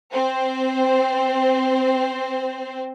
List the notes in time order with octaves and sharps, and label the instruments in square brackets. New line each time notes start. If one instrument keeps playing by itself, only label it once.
[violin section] C4 C5